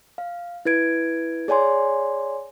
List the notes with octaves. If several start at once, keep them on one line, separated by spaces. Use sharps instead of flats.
F5
E4 B4 G#6 D7
G#4 C#5 D5 G#5 C6